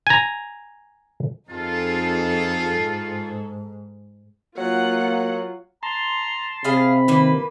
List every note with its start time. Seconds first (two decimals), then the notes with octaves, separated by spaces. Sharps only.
0.07 G#5 A#5
1.50 F2 D#4 F4 G#4 A4
2.80 G#2
4.58 F#3 A#3 F4 F#5
5.83 A5 A#5 C6
6.64 C3 G#4 F5 B5
7.08 D#3 A#3 B4